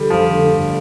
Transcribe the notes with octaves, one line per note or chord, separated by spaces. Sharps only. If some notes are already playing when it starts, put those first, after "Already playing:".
Already playing: D3 G3
F2 F3
D3 A3 D4
G1